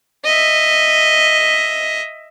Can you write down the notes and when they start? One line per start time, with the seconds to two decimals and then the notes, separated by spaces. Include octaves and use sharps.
0.24 D#5 E5